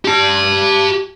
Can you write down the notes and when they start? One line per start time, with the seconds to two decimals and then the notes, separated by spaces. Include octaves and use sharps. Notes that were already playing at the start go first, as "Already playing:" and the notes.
0.05 G4 A5